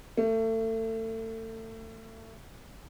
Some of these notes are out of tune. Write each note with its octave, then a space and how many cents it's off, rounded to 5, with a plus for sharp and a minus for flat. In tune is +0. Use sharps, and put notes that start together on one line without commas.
A3 +30